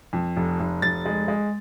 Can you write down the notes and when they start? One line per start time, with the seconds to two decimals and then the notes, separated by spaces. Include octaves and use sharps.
0.13 F2
0.36 F1
0.60 F1
0.82 F1 A6
1.05 G#3
1.28 G#3